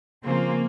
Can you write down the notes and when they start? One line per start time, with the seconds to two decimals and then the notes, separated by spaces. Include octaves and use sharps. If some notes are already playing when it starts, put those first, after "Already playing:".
0.25 C#3 F3 A#3 C4 F4 C5